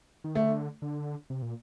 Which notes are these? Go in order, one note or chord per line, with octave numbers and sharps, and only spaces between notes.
D#3
D3 A3
D3
C3
A#2